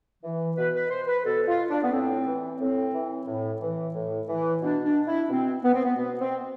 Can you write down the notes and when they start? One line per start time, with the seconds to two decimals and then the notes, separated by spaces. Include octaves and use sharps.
0.24 E3
0.57 B2 B4
0.75 B4
0.90 C5
1.07 B4
1.24 B2 A4
1.48 F4
1.70 D4
1.83 B3
1.92 A2 C4
2.26 E3
2.60 A2 C4
2.93 E3
3.26 A2
3.61 E3
3.94 A2
4.28 E3
4.62 B2 D4
4.84 D4
5.07 E4
5.29 B2 C4
5.63 B3
5.74 C4
5.84 B3
5.96 B2 B3
6.20 C4